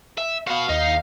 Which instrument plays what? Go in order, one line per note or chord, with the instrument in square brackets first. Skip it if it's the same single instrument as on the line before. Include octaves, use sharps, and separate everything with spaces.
[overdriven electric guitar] E5
[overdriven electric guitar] F#4 B4 [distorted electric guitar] F5
[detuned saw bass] D#2 [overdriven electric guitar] D#4